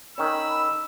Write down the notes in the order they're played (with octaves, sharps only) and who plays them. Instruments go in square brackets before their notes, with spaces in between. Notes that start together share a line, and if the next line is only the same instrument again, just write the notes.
[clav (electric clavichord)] D#3 C#4 [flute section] B5 [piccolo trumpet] E6